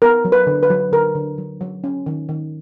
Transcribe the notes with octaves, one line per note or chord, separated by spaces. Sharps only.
B3 A#4
F#3
B4
D3
B4
F#3
D3 A#4
D3
F#3
F#3
C#4
D#3
D#3